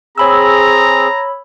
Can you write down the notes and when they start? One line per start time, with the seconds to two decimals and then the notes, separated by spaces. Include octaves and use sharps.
0.18 C4 G#4 C#5 A#5 B5 E6